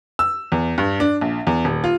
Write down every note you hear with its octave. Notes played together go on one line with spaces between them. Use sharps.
E6
E2
G2
D4
A#1
E2
D#1
F4